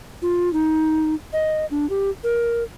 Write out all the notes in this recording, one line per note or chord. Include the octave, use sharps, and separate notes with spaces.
F4
D#4
D#5
D4
G4
A#4